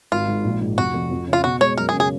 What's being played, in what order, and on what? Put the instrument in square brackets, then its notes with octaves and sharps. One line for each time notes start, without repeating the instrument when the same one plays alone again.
[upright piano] G#1 [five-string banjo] F4
[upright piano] G#2
A#1
G#2
[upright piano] F1 [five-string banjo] F#4
[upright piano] F2
F2
C#3
[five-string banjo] F4
[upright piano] B2 [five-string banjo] F#4
[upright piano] G#3 [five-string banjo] C#5
[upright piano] F#2 [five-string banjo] A#4
[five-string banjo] G#4
[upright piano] C#3
[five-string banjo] G#4